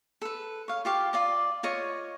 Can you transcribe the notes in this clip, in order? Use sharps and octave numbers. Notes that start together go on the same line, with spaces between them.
A4 B4
C#5 F5
F4 G4 F5
F4 D5 D#5
F4 C#5 D#5 C#6